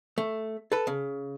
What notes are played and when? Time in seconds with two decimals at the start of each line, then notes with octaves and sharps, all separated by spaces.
0.18 A3
0.72 A4 B4
0.87 C#3